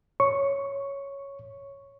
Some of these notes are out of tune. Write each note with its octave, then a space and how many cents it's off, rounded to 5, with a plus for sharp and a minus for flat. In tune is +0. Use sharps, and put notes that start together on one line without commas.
C#5 +0 C#6 +0